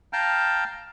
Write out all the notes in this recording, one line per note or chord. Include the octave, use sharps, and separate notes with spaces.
F5 G5 A5 A#5 F6 G6